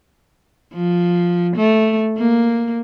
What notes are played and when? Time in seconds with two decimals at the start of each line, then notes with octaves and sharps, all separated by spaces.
0.74 F3
1.56 A3
2.17 A#3